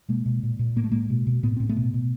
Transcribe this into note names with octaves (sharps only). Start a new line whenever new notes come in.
B2 G#3 A#3
B2
A#2
A#2
A2 A#3
A3
A2 G#3 A#3
B2
B2
A2 B3
A2 C4
A3 B3
B2
B2